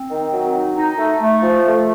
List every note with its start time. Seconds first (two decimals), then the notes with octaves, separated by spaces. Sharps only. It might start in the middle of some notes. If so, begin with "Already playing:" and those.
Already playing: C4
0.10 D#3
0.32 F#3
0.54 D#4
0.76 D#4
0.98 A3
1.21 A3
1.42 F3
1.65 A3